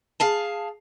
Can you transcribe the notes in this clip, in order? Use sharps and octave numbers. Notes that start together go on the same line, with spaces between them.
G#4 F5 A5